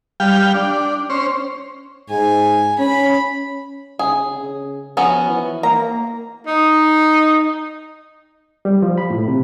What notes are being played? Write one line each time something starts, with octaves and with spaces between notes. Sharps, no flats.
G3 F5 G5
D4
C#4 C5
G#2 G#5
C#4 B5
C#3 G#4
C#3
F3 B3 C#4 F#4
E3
A#3 A#5
D#4
G3
F3
B5
A2
C3